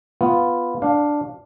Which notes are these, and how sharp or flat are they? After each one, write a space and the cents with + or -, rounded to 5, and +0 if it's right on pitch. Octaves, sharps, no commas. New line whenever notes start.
B3 +0 F4 +0
D4 +0 F5 +15